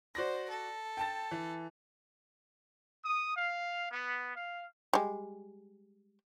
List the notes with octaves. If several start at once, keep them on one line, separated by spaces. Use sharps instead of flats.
F#4 C5 D5 A#6
A4
G5 A5 A6
E3
D#6
F5
B3
F5
G3 G#3